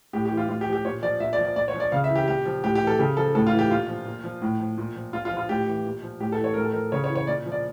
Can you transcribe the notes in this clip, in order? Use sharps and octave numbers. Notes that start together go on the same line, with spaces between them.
A2 G4
G4
E3
F4
A2 F4
G4
F3
G4
A#2 C#5
F3 D5
A#2 E5
D5
F3
D5
A#2 D5
C#5
F3
D5
C#3 F5
E5
E3
G4
A#2 G4
F3
A2 G4
G4
E3
A4
C#3 G4
F3 A4
A2 A4
F4
E3
G4
A#2 F4
F3
A#2
F3
A2
F3
A#2
F3
A#2 F4
F4
F3
F4
A2 G4
E3
A#2
F3
A2 G4
A4
E3
C#5
A2 A#4
A4
A#4
F3
C#3 C#5
C#5
E3
C#5
A#2 D5
F3
D5